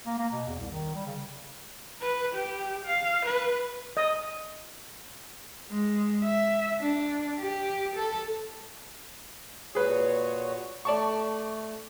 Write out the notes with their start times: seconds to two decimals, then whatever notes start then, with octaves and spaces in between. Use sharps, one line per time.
0.06 A#3
0.18 A#3
0.32 B2
0.47 E2
0.60 C2
0.71 D#3
0.94 G3
1.07 C#3
2.02 B4
2.34 G4
2.85 F5
3.25 B4
3.97 D#5
5.71 G#3
6.25 E5
6.80 D4
7.40 G4
7.95 A4
9.75 A#2 F#4 G#4 B4 C#5
10.85 A3 D5 A5 C#6